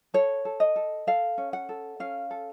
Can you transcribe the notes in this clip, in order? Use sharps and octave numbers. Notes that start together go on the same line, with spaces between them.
A4 C#5
A4
D#5
A4
A4 F5
C#4
F#5
A4
C#4 F5
A4